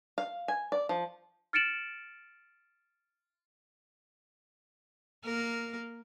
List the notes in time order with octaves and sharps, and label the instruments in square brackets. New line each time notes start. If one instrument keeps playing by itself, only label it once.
[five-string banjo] F5
G#5
D5
F3
[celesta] F6 A6 C#7 D7 E7 F#7
[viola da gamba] A#3 A#4